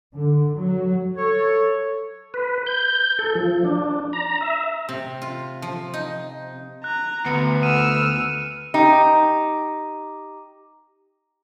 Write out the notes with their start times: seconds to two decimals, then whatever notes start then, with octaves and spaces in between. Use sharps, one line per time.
0.15 D3
0.57 F#3
1.16 A4 C#5
2.34 B4
2.67 G6
3.19 A4
3.35 F3
3.64 D4
4.13 A#5
4.41 E5
4.89 C3
5.22 F4
5.62 F3
5.94 D#4
6.84 A#5 F#6
7.26 D2 B3 C#7
7.63 E6 F6 D#7
8.74 D#4 G4